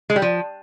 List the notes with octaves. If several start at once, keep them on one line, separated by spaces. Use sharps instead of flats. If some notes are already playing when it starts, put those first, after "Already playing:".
G#3
G3
F3